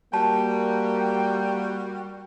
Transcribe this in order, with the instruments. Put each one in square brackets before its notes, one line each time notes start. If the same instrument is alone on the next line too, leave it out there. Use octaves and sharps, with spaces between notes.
[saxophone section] G3 F#4 [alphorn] A#3 [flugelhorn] G5 [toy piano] A5